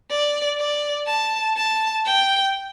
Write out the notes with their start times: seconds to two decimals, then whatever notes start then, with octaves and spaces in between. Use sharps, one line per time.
0.10 D5
0.58 D5
1.07 A5
1.56 A5
2.06 G5